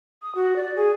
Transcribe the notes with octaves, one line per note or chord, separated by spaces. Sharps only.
D#6
F#4
D5
G#4